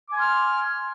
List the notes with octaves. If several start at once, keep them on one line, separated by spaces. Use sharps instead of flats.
G#5 C6 D6 F6